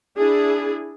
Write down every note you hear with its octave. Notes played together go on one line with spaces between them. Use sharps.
D4 E4 G#4